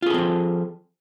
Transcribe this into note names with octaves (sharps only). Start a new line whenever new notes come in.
F3 C4 F4 G#4 A4